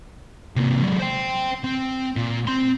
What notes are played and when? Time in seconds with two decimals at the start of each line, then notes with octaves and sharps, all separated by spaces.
0.56 C3 A#3
0.83 F#3 G#3
0.99 C5 G5
1.64 C4
2.16 A#2
2.47 C4 C6